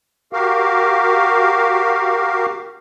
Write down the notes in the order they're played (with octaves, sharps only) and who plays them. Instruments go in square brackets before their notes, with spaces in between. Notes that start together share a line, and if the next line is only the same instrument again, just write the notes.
[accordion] F#4 G4 A#4 F5